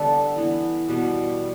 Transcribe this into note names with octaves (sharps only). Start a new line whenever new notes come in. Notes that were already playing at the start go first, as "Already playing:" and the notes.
Already playing: D3 G3 B3 A4 B4 D5
E3 B3
B2 G3 B3